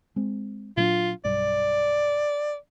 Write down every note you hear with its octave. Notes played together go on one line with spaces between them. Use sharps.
G#3 C4
A#2 F#3 D4 F4
B1 G2 D5